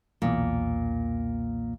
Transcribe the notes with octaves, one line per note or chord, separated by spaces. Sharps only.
B1 E2 A#2